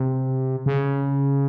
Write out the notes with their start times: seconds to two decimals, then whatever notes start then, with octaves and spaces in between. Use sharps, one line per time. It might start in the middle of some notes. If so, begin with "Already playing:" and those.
Already playing: C3
0.66 C#3